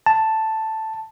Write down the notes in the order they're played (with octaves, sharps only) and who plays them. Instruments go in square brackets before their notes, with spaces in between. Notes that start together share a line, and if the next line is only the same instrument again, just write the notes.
[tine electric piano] A5